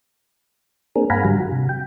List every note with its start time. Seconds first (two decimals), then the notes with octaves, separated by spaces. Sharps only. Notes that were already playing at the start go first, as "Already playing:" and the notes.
0.96 A#3 C4 D4 G#4 A#4
1.10 G2 F5 F#5 G#5 A#5 B5
1.25 G#2 D3 F#3 G3
1.40 F#4
1.52 C3
1.69 G5